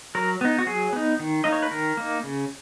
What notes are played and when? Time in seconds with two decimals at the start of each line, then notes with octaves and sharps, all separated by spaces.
0.15 F#3 A#4
0.41 B3 D#4
0.59 F#4
0.66 F#3 G#4
0.93 B3 D#4
1.19 D#3
1.44 A#3 D#4 D#5
1.52 C#5
1.62 B4
1.71 D#3 A#4
1.97 A#3 D#4
2.23 C#3